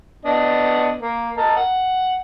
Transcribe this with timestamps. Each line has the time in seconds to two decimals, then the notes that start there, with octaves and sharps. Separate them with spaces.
0.25 B3 D4 D#5
1.00 A#3
1.37 A#4 D#5 A5
1.56 F#5